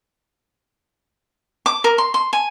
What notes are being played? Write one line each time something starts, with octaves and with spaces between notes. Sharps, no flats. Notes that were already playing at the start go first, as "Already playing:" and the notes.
D6
A#4
C6
C6
G#5